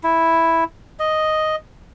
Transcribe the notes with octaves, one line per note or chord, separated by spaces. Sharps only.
E4
D#5